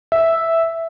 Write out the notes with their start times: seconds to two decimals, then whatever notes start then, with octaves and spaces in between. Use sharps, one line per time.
0.12 E5